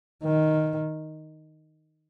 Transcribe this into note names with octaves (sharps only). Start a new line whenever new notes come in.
D#3